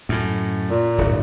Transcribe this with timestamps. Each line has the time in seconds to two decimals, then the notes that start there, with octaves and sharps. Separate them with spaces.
0.09 F#2 A2
0.70 A#2
0.98 D1 G1